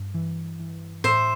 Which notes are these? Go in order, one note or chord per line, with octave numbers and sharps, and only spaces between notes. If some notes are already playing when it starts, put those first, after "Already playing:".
Already playing: G2
E3
E3
A2 C5 E5